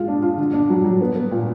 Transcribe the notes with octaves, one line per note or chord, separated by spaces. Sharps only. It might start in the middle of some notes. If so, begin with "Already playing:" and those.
Already playing: G#3 F4
D4
F4
D3
D4
F#3
F#3
B3
B3
A#2